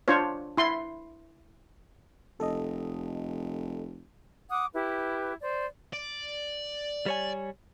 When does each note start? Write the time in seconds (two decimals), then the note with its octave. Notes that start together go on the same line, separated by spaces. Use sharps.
0.08 D4 F4 C5 C#5
0.57 E4 C6
2.40 F1 A4 D#5
4.51 F#5 D6 D#6
4.74 E4 G4 B4
5.42 C5 D5
5.93 D5
7.06 G3 C#5 G#5